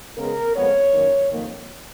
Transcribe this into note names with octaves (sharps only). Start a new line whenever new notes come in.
C#3 G#3 B3 A#4
F2 F3 G#3 B3 C#5
F#2 D#3 A#3
F2 D#3 F#3 A#3